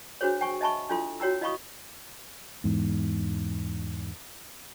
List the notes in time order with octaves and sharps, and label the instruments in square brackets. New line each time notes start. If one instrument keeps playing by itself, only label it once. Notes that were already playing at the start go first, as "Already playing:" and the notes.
[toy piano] D4 F#4 G#4 C5 C#5
G5 G#5 C#6
D#5 E5 G#5 A5 B5 C#6
D4 E4 F4 A4 C6
F#4 C#5 G5 A#5 E6
E4 D#5 F5 B5 C#6 D#6
[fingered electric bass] E2 G#2